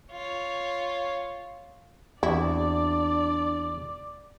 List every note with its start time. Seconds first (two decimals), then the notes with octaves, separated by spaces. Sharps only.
0.12 F4 C#5
2.23 E2 C4 D4 E4 F#4 D5